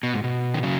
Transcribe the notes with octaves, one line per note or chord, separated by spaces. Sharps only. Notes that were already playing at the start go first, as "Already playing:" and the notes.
B2
G#2
B2
D#3
C#3 F#3